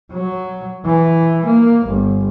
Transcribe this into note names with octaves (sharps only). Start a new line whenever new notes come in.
F#3
E3
A#3
G1